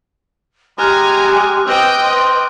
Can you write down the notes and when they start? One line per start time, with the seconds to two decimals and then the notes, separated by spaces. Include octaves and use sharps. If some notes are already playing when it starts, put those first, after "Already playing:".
0.78 G#3 G4 G#5 A#5 D6 F6 F#6
1.26 D6 F#6 D#7
1.67 C4 B4 D#5 G5 D#6 D7
2.01 C5